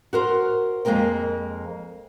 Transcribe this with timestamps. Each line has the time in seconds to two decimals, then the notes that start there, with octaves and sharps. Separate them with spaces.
0.13 F#4 A#4 C5
0.85 F2 G#3 A#3 A#4 G5